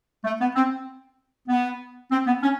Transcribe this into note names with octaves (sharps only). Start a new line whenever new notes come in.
A3
B3
C4
B3
C4
B3
C#4